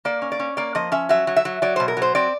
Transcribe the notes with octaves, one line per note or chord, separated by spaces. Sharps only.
A#3 D5
C#4
D5
C#4
A#3 D5
F3 D#5
C#4 E5
F#3 E5
F#3
E5
F#3
F#3 D5
B2 C5
A#4
F#3
C5
C4 D5